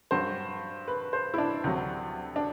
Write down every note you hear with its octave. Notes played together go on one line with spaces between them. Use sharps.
G2 F#3 C5
B4
C5
E4
D4
D2 C3 F#3
D4